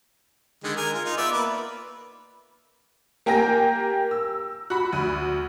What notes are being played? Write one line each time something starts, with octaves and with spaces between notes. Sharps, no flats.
D3 D#3 G#3
A#4 G#5
F4
D#4 F4
B3 D5 E5
A#3 B4
A#3 G4 A#4 G5 G#5 A#6
E6
F#4 B5
D2